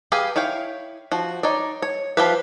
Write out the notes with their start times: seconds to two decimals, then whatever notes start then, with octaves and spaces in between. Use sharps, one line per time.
0.12 G4 G#4 B4 F5 G#5
0.36 E4 C#5 F5 G5
1.12 F3 F#4
1.43 D#4 C#5 D5
1.82 C#5
2.17 F3 E4 F4 G4 B4